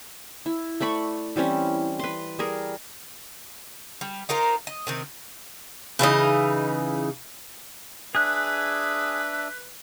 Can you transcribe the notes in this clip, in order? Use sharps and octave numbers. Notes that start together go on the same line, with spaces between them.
E4
A3 D5 B5 C#6
E3 G3 C4 C#4
B4 C6
G3 G#4 A#4
G3
D#4 F4 A#4 C5
D#5
C3 D#3 C4
C#3 E3 D#4 D#5
D4 G#4 B4 E5 F#6